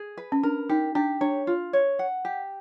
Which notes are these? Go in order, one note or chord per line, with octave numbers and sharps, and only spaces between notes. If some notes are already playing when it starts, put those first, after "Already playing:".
Already playing: G#4
B4
C#4
D4 A#4
D#4 G4
D4 G4
D4 C#5
F4
C#5
F#5
G4